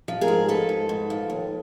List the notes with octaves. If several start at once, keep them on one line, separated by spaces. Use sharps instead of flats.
F3
G#4 A#4
G#2
F3 A4 B4
G#2
G#2
F3
D#2